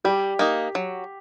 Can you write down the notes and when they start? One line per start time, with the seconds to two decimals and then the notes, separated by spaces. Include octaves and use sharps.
0.04 G3 G4
0.39 A#3 D#4
0.75 F#3